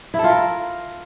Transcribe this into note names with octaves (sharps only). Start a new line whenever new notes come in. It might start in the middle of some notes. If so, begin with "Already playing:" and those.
E4
A4
F4
A#4